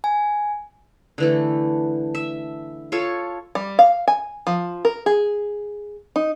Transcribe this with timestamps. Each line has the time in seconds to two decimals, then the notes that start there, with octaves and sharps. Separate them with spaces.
0.04 G#5
1.18 D3 E3 A3
2.15 E5
2.92 F4 A4 C#5
3.55 G3
3.79 F5
4.08 G#5
4.47 F3
4.85 A#4
5.06 G#4
6.16 D#4